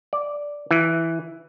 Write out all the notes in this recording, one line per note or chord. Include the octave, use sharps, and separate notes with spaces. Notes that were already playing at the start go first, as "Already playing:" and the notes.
D5
E3